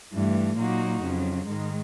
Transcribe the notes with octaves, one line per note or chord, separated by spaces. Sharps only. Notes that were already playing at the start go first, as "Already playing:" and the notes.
G2 E3 A3
A#2 F#3 A#3 D#4 F#4
F2 C#3 F#3
G#2 D#3 G#3